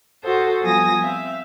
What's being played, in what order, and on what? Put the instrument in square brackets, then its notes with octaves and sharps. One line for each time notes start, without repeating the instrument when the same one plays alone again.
[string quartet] F#4 A4 C5 D#6
F3 G3 B3 G#5 D#6 A#6
C4 E5 F5